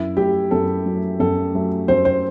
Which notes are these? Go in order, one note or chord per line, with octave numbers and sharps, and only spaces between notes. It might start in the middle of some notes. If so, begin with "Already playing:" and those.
Already playing: F#2 E4
F#3 A3 G4
F#2 A4
F#3 A3
F#2 A4
F#3 A3
F#2 C5
C5